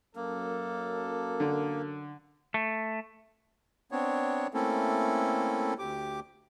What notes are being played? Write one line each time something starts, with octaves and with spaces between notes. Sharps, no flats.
F#2 A#3 A4
D3
A3
B3 C4 D4 C#5
A3 A#3 C4 C#4 E4 A4
D2 G4 D6